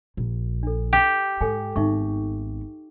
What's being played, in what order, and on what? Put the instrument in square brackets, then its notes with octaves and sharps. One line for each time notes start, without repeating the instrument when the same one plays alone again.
[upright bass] A#1
[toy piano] D4 A4
[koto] G4
[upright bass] G#2 [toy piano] A4 G5 G#5
[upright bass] G#1 B3 [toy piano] D#4 E5 C#6